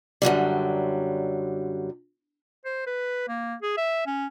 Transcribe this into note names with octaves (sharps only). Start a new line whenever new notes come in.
F#2 D3 F#3 G3
C5
B4
A#3
G#4
E5
C#4